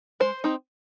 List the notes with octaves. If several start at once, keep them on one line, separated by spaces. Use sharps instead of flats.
G#3 C5
C4 D#4